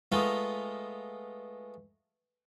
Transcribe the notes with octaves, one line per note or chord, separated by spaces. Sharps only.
G#3 A3 B3 F4 A#4 D#5